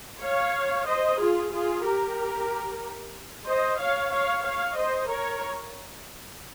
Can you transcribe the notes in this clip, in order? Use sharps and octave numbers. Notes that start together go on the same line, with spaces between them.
C#5 F5
C5 D#5
F4 G#4
F4 G#4
G4 A#4
C5 D#5
C#5 F5
C#5 F5
C#5 F5
C5 D#5
A#4 C#5